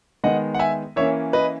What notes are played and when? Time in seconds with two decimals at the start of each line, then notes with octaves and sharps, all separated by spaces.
0.24 D#3 G#3 B3 D#5 F#5
0.54 F#5
0.59 E5 G#5
0.96 E3 A#3 C#4 C#5 E5
1.33 B4 D#5